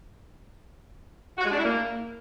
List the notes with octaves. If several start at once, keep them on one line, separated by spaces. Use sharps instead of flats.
F#4
G#3
D4
E4
A#3